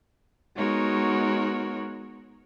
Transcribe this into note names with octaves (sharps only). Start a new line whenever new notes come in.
G#3 B3 D#4 F#4 A#4 C#5